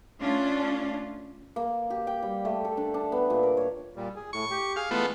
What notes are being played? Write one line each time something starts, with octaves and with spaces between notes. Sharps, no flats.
A3 C#4 D4 F4
A#3
G4
G5
G3
A3
A4
D4
D4
B3
A#2
A#4
C#5
A#2 G3
G#4
A2 C#6
G4
G#4 F5
E3 G#3 A3 B3 F4